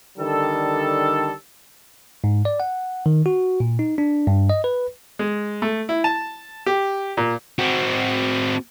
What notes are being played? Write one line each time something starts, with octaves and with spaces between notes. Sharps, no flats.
D3 D#3 G3 A4
G#2
D5
F#5
D#3
F#4
A#2
D#4
D4
G2
D#5
B4
G#3
A3
E4
A5
G4
A#2
C4 F#4